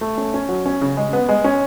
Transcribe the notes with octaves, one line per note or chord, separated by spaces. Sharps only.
A3
C#4
C#4
F#3
C#4
C#3
G#3
B3
G#3
C#4